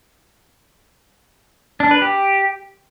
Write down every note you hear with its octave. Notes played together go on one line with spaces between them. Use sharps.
D4
B4
G4